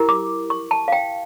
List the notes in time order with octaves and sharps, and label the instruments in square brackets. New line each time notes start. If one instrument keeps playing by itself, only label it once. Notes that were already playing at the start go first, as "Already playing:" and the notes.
Already playing: [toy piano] E4 G4 A#4
D6
C#6
A5
F5
G5